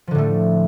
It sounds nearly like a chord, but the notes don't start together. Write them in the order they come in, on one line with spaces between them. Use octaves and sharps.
F3 D3 A2 A3